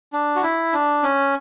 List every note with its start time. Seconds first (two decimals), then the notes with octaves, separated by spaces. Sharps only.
0.13 D4
0.36 F#4
0.43 E4
0.73 D4
1.03 C#4